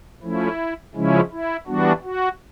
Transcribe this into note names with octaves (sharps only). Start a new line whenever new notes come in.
F3 A3 C#4 E4
C#3 F3 G#3 C#4 E4
E4
E3 G3 B3 D4 F#4
F#4